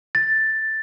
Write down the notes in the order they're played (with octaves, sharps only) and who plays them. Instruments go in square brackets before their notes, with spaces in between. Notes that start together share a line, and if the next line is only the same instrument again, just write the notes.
[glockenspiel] A6